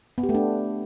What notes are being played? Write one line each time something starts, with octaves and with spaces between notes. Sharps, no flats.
B3
G4
A3
D4